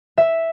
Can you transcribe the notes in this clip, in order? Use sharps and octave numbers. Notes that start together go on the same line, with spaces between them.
E5